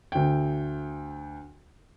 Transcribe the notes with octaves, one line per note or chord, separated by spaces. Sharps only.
D2 G5